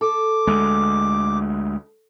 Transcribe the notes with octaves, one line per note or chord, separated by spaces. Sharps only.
A4 D6
D2 G#3